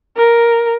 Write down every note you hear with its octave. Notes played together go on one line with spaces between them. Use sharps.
A#4